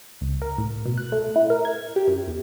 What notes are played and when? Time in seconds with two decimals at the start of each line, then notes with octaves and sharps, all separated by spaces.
0.21 C#2
0.42 A#4
0.58 A2
0.86 B2
0.98 F#6
1.12 A3
1.36 E4
1.50 A#4
1.65 G#6
1.96 G4
2.08 F#2
2.27 E2